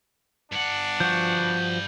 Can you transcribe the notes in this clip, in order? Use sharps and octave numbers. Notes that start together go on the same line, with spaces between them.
G2 D4 F#5
F3 F#4 G6